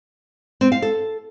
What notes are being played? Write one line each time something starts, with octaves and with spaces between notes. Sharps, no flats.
C4
F5
A4